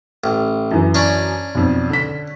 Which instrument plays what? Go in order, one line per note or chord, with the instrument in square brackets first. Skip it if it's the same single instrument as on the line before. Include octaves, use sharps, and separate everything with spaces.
[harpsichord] A1
[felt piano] F#2 E3
[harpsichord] C#4 D4
[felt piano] B1 F2
D3 B6